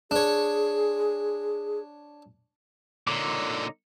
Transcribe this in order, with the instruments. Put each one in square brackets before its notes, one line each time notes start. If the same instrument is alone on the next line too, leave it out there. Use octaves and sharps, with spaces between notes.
[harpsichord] D4 C#5 [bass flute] G#4
[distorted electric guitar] A#2 D3 [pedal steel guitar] D#4 C#5 D6